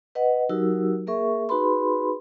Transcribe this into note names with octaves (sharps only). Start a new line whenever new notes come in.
B4 D#5 F#5
F#3 D#4 F#4 G4 A#4 E6
A#3 G#4 A#4 E5 C#6
D#4 F#4 G#4 B4 B5 C6